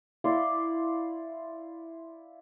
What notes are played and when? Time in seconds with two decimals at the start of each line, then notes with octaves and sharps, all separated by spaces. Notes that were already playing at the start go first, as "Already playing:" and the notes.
0.24 E4 D5 F5 C6